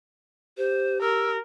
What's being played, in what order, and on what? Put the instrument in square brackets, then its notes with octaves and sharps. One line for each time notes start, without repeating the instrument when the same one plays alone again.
[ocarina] G4 [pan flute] C5
[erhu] A#4 [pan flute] E6